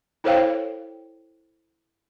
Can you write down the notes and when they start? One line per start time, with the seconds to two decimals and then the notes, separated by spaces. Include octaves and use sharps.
0.24 E4 A4 C5 C#5 F5 G5